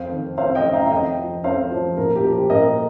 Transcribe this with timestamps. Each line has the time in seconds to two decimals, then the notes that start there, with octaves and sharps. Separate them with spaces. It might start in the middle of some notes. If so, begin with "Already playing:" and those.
Already playing: F2 C5 F5
0.12 D#3
0.38 F2 C5 F5
0.55 D#5 G5
0.65 D#3
0.73 F5 A#5
0.86 F5
0.91 F2 D#5 G5
1.18 F3
1.44 F2 C5 F5
1.71 F3
1.97 A#2 A#4
2.16 G4
2.24 F3
2.33 G4
2.50 A#2 A#4 D#5